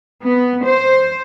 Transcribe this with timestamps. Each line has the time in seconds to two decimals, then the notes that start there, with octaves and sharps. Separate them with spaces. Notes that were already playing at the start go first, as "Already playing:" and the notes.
0.23 B3
0.64 C5